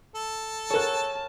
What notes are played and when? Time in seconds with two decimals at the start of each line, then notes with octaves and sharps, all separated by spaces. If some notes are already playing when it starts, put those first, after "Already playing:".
0.15 A4
0.70 F#4 G#4 A#4 C#5 A5